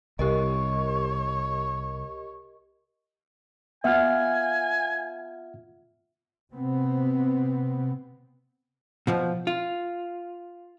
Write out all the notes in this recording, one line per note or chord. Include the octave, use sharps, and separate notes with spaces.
C2 G4 A#4 C#5 D#5
B3 F4 E5 F#5 G#5 F6
C3 B3 C4
B2 F3
F4